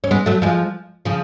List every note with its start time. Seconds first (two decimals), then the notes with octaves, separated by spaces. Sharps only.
0.04 C#4
0.11 G#3 B3
0.26 F#3 A3
0.42 F3 G#3
1.05 C#3 F3